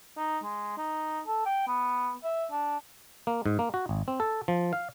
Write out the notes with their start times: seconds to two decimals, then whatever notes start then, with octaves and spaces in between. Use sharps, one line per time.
0.17 D#4
0.44 G#3
0.78 D#4
1.27 A4
1.46 G5
1.67 B3
2.24 E5
2.51 D4
3.27 A#3
3.46 G#2
3.59 A#3
3.74 F#4
3.89 G#1
4.08 C4
4.20 A4
4.48 F3
4.73 F5